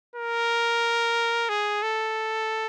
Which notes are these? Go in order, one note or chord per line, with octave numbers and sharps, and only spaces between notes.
A#4
G#4
A4